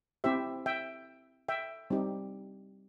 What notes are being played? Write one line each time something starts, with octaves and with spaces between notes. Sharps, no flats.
C4 E4 G4 C5 E5
E5 G5
E5 G5
G3 C4 D#4 G4